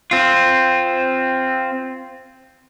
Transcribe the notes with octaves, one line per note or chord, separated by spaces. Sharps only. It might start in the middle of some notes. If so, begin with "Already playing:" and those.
C4 F4